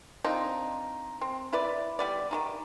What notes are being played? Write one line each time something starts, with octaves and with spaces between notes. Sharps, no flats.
F3 C4 D4 D#4
C4
E4 B4 D5
G3 B3 D5
D#3 G#3 D#4